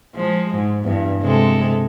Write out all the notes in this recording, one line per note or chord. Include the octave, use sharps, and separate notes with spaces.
F3 G#3
G#2
E2 G2
C3 G#3 A4